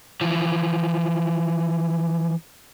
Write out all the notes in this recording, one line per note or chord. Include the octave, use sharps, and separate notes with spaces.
E3 F3